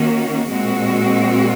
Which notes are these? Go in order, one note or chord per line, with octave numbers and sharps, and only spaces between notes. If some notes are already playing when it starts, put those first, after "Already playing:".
Already playing: D#3 A#3 C#4 F#4
A#2 G#3 C4 F#4